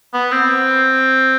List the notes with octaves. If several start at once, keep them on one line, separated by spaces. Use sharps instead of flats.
B3
C4